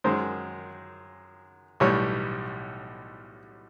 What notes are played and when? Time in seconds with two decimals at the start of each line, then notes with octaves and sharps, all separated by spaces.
0.04 F#2 D#3 G#3 C5
1.80 B1 A2 E3 G3 C#5